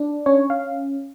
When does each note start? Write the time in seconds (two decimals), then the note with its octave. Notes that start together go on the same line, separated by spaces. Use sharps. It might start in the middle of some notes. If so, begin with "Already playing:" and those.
Already playing: D4
0.26 C#4 C#5
0.50 F5